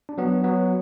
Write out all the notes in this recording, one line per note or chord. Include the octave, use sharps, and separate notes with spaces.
D4
F#3 B3
F#3 B3